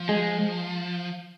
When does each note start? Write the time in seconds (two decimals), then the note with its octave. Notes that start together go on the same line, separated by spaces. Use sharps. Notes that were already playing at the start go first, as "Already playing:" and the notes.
Already playing: F3
0.09 G#3